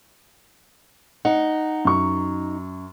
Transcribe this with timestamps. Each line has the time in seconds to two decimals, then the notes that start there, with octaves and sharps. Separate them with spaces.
1.25 D#4 F#5
1.85 F#2 C#6